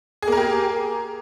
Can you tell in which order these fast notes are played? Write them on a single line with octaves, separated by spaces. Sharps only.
G#4 A#3 A#4 G4